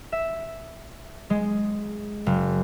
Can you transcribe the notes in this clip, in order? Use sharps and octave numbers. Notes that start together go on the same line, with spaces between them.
E5
G#3
F#1